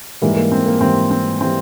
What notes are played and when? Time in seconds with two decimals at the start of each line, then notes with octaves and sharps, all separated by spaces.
0.22 G#2 E3 G3 A#3
0.36 A#3
0.52 C4
0.66 A#3
0.81 G#2 E3 G3 C4
1.11 C4
1.41 E3 G3 C4